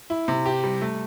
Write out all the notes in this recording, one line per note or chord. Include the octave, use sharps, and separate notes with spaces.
E4
C3
G4
G3
A3